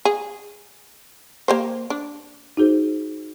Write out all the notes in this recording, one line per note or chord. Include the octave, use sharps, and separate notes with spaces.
G#4
A#3 G4 C5
D4
D#4 F#4 G#4 C5